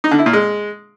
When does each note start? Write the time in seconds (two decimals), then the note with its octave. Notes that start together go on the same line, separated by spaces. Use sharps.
0.04 D#4
0.11 D3
0.19 E4
0.26 A#2
0.33 G#3